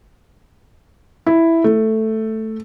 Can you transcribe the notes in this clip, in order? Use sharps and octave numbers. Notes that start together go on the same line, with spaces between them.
E4
A3